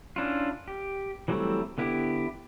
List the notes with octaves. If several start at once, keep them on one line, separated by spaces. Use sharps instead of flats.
C#4 D4 E4 F4
G4
E3 F#3 G3 A3 C4
D3 B3 E4 G4